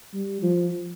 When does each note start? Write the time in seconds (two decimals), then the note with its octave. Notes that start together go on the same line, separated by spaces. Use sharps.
0.14 G3
0.42 F3